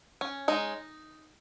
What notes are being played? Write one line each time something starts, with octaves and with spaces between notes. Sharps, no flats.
C#4
G#3 D#4